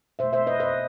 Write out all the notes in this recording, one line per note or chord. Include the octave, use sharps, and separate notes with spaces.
B2 A3 C5 E5
C5 E5
B4 D#5
B4 D#5